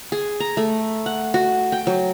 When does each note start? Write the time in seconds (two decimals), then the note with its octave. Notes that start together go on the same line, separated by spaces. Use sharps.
0.12 G#4
0.40 A#5
0.57 A3
1.06 F#5
1.34 F#4
1.72 G5
1.87 F#3